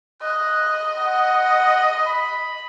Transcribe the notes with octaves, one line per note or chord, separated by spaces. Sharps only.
D#5 F#6
F#5
B5